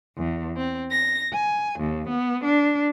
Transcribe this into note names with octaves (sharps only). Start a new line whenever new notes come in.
E2
C4
A#6
G#5
D#2
B3
D4